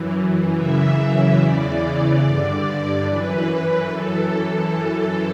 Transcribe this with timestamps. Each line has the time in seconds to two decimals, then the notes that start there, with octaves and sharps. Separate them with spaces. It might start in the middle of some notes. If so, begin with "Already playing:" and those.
Already playing: F#2 E3
0.55 F#2 C#3 E3 E5
1.38 E2 C#3 E3 D5
2.22 G2 D3 D5
3.05 F#2 E3 B4
3.88 F#2 E3 A4